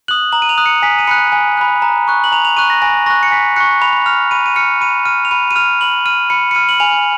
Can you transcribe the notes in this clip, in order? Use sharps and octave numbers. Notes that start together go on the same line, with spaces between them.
D#6 F#6 F#7
A#5 F#7
D#7
F7
D#6 F#6
C#7
G#5 B6
D#7
B5 F#6 C#7
G#5
B5 F#6
A#5
C#6 F#6
F#7
A#5 F7
F7
C#6 F#6 D#7
A#6
G#5 A#6
C#6 F#6 A#6
C#7
G#5 B6
C#6 F#6 C#7
B5 F7
F6 F7
B5 D#7
D#7
F6 C#7
B5 D#7
F6 D#7
F7
B5 D#7
D#7
F6 F7
B5 F#7
F6 D#7
B5 C#7
C#7
F6 D#7
F#7
G#5 F7